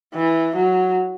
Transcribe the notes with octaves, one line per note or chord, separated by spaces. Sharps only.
E3
F#3